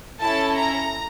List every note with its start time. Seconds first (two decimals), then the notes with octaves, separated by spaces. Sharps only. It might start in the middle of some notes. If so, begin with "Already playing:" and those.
0.20 C#4 E4 A4 A5
0.58 A#5